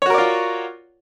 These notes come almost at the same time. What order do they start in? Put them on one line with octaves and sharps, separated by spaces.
C#5 F#4 A#4 D5 F4